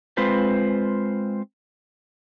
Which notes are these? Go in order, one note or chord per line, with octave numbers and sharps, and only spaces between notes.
G#3 C4 F4 B4 C5